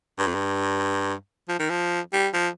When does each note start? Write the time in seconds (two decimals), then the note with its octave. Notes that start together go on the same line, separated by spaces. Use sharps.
0.19 G2
0.27 F2
0.34 G2
1.49 F3
1.59 D#3
1.70 F3
2.13 G3
2.33 F3